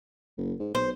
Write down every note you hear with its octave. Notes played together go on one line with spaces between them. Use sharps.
F#1
G#2
B1 C5